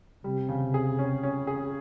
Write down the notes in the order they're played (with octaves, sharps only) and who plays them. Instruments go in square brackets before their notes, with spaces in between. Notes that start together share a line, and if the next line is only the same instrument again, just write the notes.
[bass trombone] C3 [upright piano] G3
[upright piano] C#3
G#4
C#4
C#4
G#4